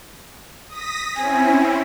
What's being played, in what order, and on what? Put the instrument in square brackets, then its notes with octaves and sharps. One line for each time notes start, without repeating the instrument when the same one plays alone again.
[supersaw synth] D#6 A#6 B6
[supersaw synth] C4 C#4 E4 [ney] G#5